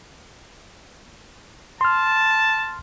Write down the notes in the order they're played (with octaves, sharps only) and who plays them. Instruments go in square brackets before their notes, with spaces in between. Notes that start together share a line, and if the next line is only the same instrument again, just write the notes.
[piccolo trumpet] A5 [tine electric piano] C6 F6